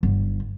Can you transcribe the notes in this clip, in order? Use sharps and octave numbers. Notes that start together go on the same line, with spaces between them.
G1